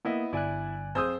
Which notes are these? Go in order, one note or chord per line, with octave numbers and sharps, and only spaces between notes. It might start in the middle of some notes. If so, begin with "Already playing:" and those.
A#3 B3 E4 D#5
G1 E4 D5 G#5 F#6
F2 G#4 C5 D#6 E6 G6